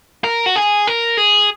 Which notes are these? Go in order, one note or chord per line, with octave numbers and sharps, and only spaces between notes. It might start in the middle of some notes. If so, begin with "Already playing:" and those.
A#4
F#4
G#4
A#4
G#4